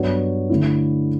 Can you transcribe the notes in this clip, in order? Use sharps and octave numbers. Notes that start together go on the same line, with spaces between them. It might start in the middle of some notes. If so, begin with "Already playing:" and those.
Already playing: G2 F#3 B3 F#4 C#5
D3 A3 E4